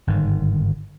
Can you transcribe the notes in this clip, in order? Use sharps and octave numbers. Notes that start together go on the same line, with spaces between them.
G1 G#2 D#3